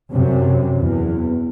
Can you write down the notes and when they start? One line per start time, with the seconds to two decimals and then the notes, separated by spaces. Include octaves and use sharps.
0.13 F#2 C3
0.77 E2